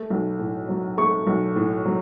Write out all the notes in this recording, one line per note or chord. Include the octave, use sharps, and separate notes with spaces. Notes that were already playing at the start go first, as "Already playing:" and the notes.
Already playing: A3
B1
A2
F#3
A3 C#6
B1
A2
F#3